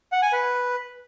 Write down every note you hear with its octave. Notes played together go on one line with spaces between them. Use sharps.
F#5
G#5
B4